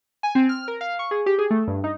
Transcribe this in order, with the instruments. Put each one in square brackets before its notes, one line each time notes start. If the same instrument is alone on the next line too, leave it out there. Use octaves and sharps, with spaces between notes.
[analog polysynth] G#5
C4
F6
A#4
F5
C#6
G#4
G4
G#4
A3
G2
D#4